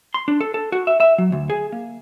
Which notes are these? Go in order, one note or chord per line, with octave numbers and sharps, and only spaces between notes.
C6
D4
A4
A4
F#4
E5
E5
F#3
D2
G#4
A#3